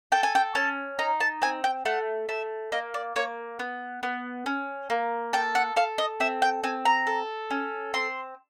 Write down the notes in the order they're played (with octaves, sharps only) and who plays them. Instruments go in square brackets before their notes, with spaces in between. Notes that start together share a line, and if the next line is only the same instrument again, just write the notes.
[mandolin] A4 G5
G#5
G5
C#4 A5
D#4 A#5
A5
C4 G#5
G5
A3 F#5
A3 E5
A#3 D#5
D5
A#3 C#5
B3
B3
C#4
A#3
A4 G5
F#5
A4 F5
D#5
C4 E5
G5
C4 G#5
A#5
A4
C#4
C4 C6